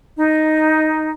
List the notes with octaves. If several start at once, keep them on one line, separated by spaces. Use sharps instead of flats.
D#4